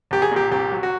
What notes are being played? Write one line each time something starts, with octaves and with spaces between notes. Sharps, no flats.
C2 G4
G#4
A#2 G4
C2 G4
F#3
F#4